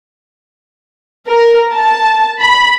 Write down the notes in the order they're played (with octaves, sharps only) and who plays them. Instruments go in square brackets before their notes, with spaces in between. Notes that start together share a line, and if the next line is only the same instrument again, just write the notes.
[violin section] A#4
A5
B5